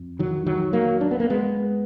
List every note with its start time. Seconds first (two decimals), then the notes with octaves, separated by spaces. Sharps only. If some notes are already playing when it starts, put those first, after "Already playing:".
Already playing: F2
0.19 D#3 F#3
0.46 D#3 F#3
0.73 F#3 A#3
1.01 D4
1.11 B3
1.20 A#3
1.30 G#3 B3